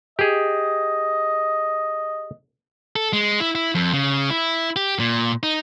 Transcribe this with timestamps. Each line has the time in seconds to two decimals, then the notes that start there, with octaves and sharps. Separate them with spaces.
0.19 G4 G#4 D#5
2.96 A4
3.13 G#3
3.40 E4
3.55 E4
3.75 F2
3.93 C#3
4.30 E4
4.76 G4
5.00 A#2
5.43 D#4